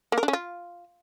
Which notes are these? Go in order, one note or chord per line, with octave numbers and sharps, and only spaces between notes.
A#3
A#4
D4
C#4
F4